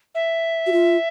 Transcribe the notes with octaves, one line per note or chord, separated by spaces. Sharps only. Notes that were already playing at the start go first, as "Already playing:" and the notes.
E5
F#4
F4